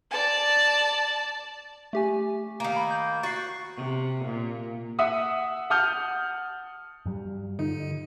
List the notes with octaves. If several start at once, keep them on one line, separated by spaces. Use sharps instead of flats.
D5 A5
A3 G4 G#5
D#3 A#3
B5
G6
F#4 A6 C7
C3
A#2
E5 F#5 D#6
F#5 A5 D#6 F6 G6
G2 F#3 G3
D3 D#4